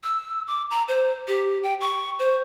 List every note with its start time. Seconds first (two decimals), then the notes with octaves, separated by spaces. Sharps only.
0.03 E6
0.47 D6
0.71 A#5
0.88 C5
1.28 G4
1.63 G5
1.81 C#6
2.19 C5